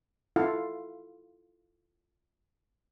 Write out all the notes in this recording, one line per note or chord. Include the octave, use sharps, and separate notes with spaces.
E4 F4 A4 F5 F#5